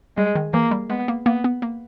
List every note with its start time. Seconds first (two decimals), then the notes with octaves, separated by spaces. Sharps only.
0.17 G3 G#3
0.35 D#3
0.53 E3 A#3
0.71 G3
0.90 G#3 B3
1.08 A#3
1.26 A#3 B3
1.44 B3
1.62 A#3